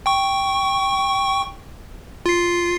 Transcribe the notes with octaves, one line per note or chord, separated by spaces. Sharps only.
G5 C#6
F4 C7